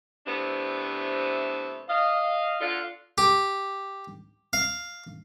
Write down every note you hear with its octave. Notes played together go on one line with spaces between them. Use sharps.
C3 E3 A3 B3 C4 D4
D#5 F5
D3 F4
G4
F5